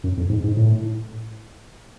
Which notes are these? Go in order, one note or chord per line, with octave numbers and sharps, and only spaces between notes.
F#2
F2
G#2
G#2
A2